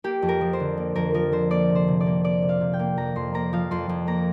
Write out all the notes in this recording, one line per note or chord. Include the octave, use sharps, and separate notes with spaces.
A#3 G4
F2
A#4
F3
C5
D3
A#3
F2 A#4
F3 A#4
D3 C5
A#3 D5
C3
C5
C3
D5
A#3
A#3 D5
C3
F5
C3
G5
A#3
F2 A#5
F2 C6
A#3 A#5
F3 F5
F2 C6
F2
A#3 A#5